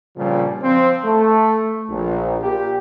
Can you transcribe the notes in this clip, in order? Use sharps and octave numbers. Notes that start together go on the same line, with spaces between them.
G2 A#2 C#3 F3 G3
F3 C4
A3
A#1
A#2 G4